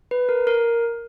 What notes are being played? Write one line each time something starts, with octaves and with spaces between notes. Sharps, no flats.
B4
A#4
A#4